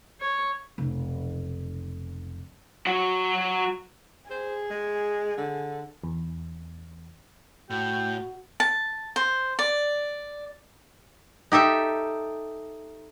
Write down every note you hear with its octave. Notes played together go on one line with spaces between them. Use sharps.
C#5
F1 B1
F#3 F#4
G#4 C5
G#3
D3
E2
A2 F#4 G5
A5
C5
D5
D#4 G4 A4 E5